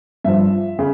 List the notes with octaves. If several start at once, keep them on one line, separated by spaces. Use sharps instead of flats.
G2 F3 E5
C#3